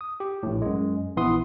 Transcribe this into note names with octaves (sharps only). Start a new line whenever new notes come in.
D#6
G4
A#1 A2
F#2 G#3
A#1 E3 B3 E4 C6 D#6